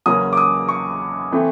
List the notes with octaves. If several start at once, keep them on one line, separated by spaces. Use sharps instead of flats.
E2 C#3 F#3 A#3 C#4 D#6
D6
D#6
C#6
E3 A3 C4